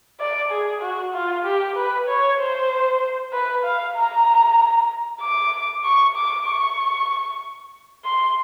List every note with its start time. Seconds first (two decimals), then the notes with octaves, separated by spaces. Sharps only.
0.20 D5
0.51 G#4
0.82 F#4
1.14 F4
1.45 G4
1.76 B4
2.08 C#5
2.38 C5
3.33 B4
3.64 F5
3.96 A#5
5.21 D6
5.84 C#6
6.16 D6
6.46 C#6
8.04 C6